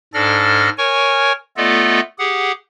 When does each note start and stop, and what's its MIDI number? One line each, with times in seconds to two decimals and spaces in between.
0.14 0.69 44
0.14 0.69 62
0.14 0.69 69
0.14 0.69 74
0.14 0.69 89
0.14 0.69 94
0.78 1.32 70
0.78 1.32 73
0.78 1.32 80
0.78 1.32 85
1.57 2.00 57
1.57 2.00 59
1.57 2.00 65
1.57 2.00 69
1.57 2.00 74
1.57 2.00 75
2.19 2.52 67
2.19 2.52 68
2.19 2.52 78